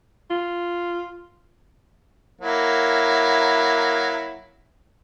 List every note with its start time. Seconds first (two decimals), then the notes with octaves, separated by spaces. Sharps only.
0.30 F4
2.41 F#3 A#3 E4